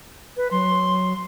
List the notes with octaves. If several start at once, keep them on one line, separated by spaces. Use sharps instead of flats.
B4
F#3 C6